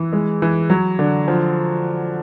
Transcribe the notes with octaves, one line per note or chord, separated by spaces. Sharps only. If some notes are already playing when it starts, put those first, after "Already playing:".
Already playing: E3
G#3
E3
F#3
D3
F3